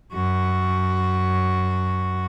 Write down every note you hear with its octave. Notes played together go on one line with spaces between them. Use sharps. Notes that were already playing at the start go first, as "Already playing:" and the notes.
F#2 F#4